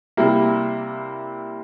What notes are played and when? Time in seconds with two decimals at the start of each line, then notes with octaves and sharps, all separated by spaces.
0.17 C3 G3 A#3 E4